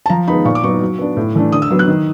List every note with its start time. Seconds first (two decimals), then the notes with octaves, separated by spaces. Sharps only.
0.06 A5
0.10 F3 A#5
0.28 G#3 B3 D#4 B5
0.45 A#2 C#6
0.55 D6
0.63 F#3 B3 D#4 C#6
0.81 F#3
0.99 B3 D4
1.17 A2
1.35 E3 A3 D4
1.52 D3 D#6
1.62 E6
1.71 F#3 B3
1.79 F#6
1.88 D#3